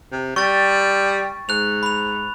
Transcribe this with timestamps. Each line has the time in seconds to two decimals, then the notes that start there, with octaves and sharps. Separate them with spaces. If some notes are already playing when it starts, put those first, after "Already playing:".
0.12 C3
0.36 G3 C#6 A6
1.49 G#2 F#6 F7
1.83 B5 F7